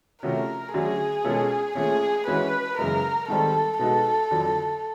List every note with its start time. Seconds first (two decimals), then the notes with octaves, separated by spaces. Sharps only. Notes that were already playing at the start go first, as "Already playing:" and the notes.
0.23 C3 F3 A3 C#4 F#4 A#4
0.74 D3 F#3 A3 C#4 F#4 G#4
1.25 B2 G#3 C#4 F4 A4
1.75 A#2 F3 A3 C#4 G#4
2.27 E3 G#3 C#4 F#4 B4
2.78 F#2 C#3 E3 G#3 B3 A#4
3.28 G#2 D#3 G3 C4 A4
3.79 B2 G#3 B3 D#4 F#4 A4
4.31 F2 D3 F#3